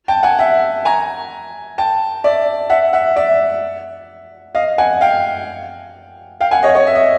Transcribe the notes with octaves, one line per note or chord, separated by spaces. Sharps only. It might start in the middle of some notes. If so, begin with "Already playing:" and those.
G5 A5
F#5 G#5
E5 F#5
G#5 A#5
G5 A5
D5 E5
E5 F#5
E5 F#5
D5 E5
D#5 F5
F#5 G#5
F5 G5
F5 G5
F#5 G#5
C#5 D#5
C#5 D#5
E5
D#5